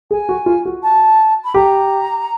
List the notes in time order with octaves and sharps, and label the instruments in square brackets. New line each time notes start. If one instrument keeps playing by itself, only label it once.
[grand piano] G#4 [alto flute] G#5
[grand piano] F#4
F4
F#4
[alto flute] A5
B5
[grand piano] G4 [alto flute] A#5